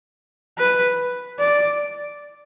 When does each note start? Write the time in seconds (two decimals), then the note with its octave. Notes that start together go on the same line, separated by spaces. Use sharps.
0.58 B4
1.39 D5